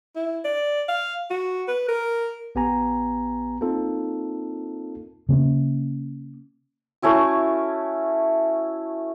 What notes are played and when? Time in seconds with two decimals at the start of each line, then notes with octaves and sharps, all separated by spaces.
0.16 E4
0.44 D5
0.88 F5
1.30 F#4
1.68 B4
1.88 A#4
2.55 A#1 B3 G4 G#5 A#5
3.61 A#3 C4 D#4 F4 A4
5.29 C#3 A#3 C4 C#4
7.02 A3 C#4 E4 F#4